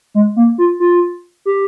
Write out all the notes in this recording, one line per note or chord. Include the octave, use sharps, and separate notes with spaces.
G#3
A#3
F4
F4
G4